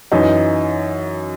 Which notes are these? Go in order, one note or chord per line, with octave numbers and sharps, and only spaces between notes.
F#2 E3 D#4